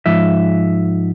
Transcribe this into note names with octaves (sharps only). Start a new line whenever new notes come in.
G#2 F3 E5